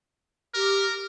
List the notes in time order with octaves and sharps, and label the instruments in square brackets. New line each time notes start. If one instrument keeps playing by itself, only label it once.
[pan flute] G4 [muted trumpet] A#4